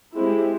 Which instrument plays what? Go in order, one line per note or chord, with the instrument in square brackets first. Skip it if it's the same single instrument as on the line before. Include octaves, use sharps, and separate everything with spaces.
[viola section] G#3 C4 E4 G4